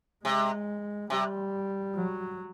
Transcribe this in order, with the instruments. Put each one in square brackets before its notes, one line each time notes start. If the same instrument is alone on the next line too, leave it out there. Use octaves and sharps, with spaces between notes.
[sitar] C3 [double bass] G#3
[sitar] C3 [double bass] G3
[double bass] F#3